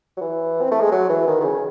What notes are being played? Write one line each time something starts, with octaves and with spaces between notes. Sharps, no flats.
F#3
E3
C4
A3
G#3
F#3
E3
D#3
D#3
C#3